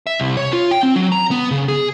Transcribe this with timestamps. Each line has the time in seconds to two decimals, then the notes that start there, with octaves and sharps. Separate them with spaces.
0.07 E5
0.20 C2
0.37 C#5
0.53 F4
0.71 G5
0.83 C4
0.96 F#3
1.12 A#5
1.31 B3
1.51 C#3
1.68 G#4